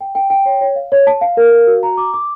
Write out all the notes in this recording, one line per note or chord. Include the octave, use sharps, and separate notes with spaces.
G5
G5
G5
C#5
C#5
F5
C#5
A5
F5
A#4
F5
F#4
A#5
D6
D6